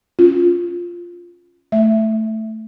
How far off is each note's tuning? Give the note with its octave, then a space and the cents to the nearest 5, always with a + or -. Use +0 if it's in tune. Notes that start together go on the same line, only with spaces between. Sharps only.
C#4 +0 F4 +0
A3 +0 E5 +5